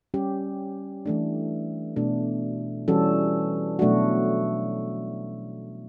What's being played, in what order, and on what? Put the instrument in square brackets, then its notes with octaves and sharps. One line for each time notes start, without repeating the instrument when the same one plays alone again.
[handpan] G3 C#4 G4
E3 A3 D4
B2 A3 D4
E3 G3 C#4 F#4 A4
B2 F#3 A3 D4 F#4